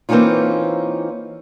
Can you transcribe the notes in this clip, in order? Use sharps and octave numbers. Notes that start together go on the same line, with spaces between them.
E3 A#3 C4 C#4 D#4 F4